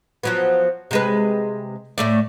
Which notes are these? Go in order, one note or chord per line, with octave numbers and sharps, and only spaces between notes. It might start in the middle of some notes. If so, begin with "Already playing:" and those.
F3 F#3 B3
C3 G#3 B4
A2 A3 D5